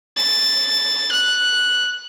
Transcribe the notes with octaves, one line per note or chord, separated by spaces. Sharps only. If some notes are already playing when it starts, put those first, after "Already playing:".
A6
F#6